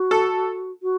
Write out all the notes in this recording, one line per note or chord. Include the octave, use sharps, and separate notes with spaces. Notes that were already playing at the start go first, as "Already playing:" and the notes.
Already playing: F#4
A4
F#4